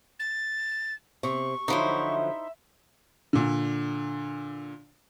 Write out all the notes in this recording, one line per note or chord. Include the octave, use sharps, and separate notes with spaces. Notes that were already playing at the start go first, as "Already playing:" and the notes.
A6
C3 C#6
D3 F3 F#3 D#4 E4 C5 E5
A#2 D3